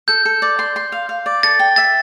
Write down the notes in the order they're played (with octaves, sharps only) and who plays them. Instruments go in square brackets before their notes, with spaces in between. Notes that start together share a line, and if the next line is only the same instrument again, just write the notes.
[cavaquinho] A4 [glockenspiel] G6
[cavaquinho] A4
D5
C6
C6
F5
F5
D5
[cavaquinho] A4 [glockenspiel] A6
[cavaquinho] G5
[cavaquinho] E5 [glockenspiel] A6